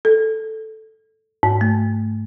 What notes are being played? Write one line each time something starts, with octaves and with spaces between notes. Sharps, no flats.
A4
G#2
A3